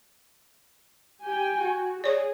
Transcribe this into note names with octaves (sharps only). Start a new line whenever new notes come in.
G4 G5 G#5
F#4
G#4 C#5 D5